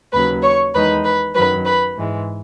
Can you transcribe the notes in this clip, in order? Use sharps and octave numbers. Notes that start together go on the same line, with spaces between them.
D#2 C#3 F#3 B4 B5
C#5 C#6
E2 D#3 G#3 D#4 B4 B5
B4 B5
F#2 D#3 F#3 B4 B5
B4 B5
G#2 E3 G#3